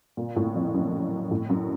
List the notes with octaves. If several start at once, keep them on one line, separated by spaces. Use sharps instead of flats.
A#2
A2
F2
F#2
A2
F#2